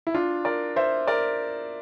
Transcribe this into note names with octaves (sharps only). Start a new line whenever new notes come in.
E4
D4 F4
A#4 D5
C5 E5
A#4 D5